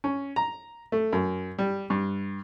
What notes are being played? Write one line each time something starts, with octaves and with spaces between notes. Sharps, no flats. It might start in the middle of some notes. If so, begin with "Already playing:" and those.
C#4
A#5
A3
F#2
G3
G2